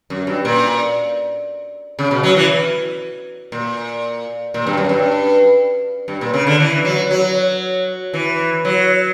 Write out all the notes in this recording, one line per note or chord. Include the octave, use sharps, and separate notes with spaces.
F#2
G2
A#2
C#3
B2
F#3
E3
A#2
A#2
G2
F#2
G2
G2
A#2
C#3
D3
E3
F#3
F#3
E3
F#3